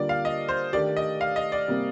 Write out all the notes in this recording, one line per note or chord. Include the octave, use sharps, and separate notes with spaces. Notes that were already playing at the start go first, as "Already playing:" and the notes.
Already playing: D3 G3 A#3 D4 F4 D5
F5
D#5
C5
D#3 A3 D4 G4 A#4 D5
D#5
F5
D#5
D5
C3 G3 A#3